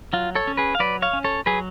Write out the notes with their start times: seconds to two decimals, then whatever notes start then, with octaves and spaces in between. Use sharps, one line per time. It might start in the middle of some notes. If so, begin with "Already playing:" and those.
0.13 F#3 F4
0.35 A4 C#5
0.47 C#4
0.57 G#4 B4
0.75 F5
0.79 F#3 B4 D5
1.02 C#5 F5
1.13 C#4
1.24 A4 C#5
1.46 F#3 G#4 B4